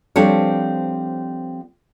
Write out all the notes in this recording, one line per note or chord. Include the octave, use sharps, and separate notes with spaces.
F3 G3 C4 D4 A4 C#5